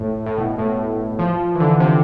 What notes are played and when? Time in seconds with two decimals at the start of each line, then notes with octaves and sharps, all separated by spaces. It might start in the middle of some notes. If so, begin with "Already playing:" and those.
Already playing: A2
0.26 A2
0.38 B2
0.58 A2
1.19 F3
1.55 E3
1.60 D3
1.80 C3